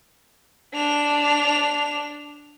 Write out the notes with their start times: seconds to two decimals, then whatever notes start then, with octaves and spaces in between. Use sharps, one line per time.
0.74 D4 F7